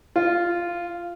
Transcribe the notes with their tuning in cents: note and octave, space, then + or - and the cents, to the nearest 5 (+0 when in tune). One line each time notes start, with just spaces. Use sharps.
F4 -10